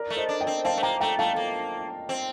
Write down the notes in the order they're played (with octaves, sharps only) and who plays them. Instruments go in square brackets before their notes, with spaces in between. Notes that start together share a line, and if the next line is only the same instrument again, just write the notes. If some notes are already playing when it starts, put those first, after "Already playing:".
Already playing: [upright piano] A#4 D5
[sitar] A3
[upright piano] C5 D#5
[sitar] D4
[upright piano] D#5 G5
[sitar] C4
[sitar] C4 [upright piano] F5 A5
[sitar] A3
[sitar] A#3 [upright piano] G5 A#5
[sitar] A3 [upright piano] G5 A#5
[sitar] A3 [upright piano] F5 A5
[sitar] A#3
C4